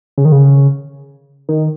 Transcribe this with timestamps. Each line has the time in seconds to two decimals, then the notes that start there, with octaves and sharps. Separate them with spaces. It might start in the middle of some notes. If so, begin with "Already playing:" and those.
0.18 C#3
0.25 D#3
0.32 C#3
1.49 D#3